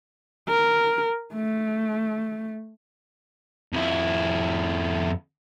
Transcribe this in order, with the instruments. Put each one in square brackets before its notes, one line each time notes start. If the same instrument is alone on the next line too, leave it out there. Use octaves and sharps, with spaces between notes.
[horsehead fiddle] A#4
A3
[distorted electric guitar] F2 E4